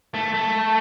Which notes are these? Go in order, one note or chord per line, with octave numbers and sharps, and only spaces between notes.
A3
A3